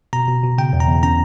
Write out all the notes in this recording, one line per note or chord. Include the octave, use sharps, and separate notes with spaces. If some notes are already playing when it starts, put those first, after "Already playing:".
B2 A#5
B2
B2
C#3 G5
E2
A#5
E2
C#4 A#5